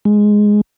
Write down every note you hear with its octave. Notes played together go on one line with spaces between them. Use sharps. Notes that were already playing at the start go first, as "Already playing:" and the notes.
G#3